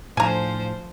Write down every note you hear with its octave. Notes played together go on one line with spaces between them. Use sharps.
A2 F3 D4 C5 G#5 A#5